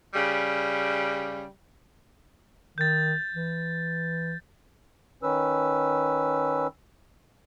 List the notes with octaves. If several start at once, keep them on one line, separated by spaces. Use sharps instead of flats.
C#3 G3
D#3 G6 A6
E3
D#3 C#4 B4 E6